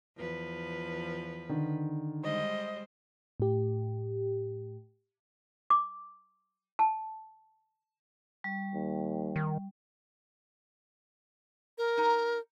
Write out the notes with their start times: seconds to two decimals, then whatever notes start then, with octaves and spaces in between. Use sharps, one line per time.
0.17 E2 F3 B4
1.49 D3 D#3
2.24 G3 G#3 C5 D#5
3.40 A2 G4
5.70 D6
6.79 A5
8.44 G3
8.74 D#2
9.36 D#3
11.78 A#4
11.97 D#4 A#5